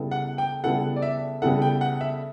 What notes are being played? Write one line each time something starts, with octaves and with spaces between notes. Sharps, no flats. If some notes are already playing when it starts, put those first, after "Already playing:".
Already playing: C#3 G3 B3 E4 A4
F#5
G5
C#3 G3 B3 E4 A4 F#5
D5
E5
C#3 G3 B3 E4 A4 F#5
G5
F#5
E5